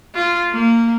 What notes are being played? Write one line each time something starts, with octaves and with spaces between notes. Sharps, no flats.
F4
A#3